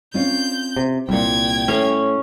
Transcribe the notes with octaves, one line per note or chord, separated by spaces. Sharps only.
C4 C#4 F4 G6
C3
C2 A#2 G3 G5 G#6
A2 C#4